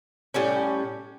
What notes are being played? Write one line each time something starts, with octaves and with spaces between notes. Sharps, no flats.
A2 G3 C#4